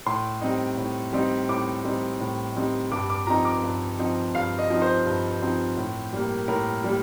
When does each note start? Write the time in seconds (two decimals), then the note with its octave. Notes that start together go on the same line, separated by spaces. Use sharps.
0.06 A2 C6
0.41 G3 C4 D#4
0.77 A2
1.13 G3 C4 D#4
1.49 A2 D6
1.85 G3 C4 D#4
2.20 A2
2.56 G3 C4 D#4
2.92 G2 D6
3.10 D6
3.27 F3 C4 D#4 A#5
3.45 D6
3.64 G2
3.99 F3 C4 D#4
4.35 G2 F5
4.59 D#5
4.70 F3 C4 D#4
4.82 C5
5.06 G2
5.42 F3 C4 D#4
5.77 A2
6.13 G3 A#3
6.48 A2 A#4
6.84 G3 A#3